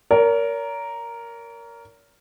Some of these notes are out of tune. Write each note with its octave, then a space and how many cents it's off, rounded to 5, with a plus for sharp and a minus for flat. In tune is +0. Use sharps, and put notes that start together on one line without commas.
A#4 +0 C#5 +45